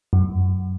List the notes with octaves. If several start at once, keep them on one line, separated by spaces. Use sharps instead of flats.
F#2